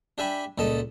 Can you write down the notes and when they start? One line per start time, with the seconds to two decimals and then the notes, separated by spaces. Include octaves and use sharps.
0.18 D4 G4 E5 G#5 B5
0.58 C#2 A#2 A4 D#5 A5